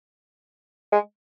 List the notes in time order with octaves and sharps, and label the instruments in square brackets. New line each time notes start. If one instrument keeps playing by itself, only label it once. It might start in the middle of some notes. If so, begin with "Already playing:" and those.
[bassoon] G#3